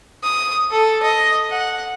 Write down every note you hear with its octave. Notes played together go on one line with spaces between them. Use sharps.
D#6
A4
D#5
F#5